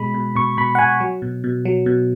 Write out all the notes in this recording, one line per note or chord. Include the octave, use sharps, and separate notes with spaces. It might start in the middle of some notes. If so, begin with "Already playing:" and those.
Already playing: B2 G#3 B5
B2
B2 C#6
B2 B5
F#5
B2 G#5
F#3
B2
B2
F#3
B2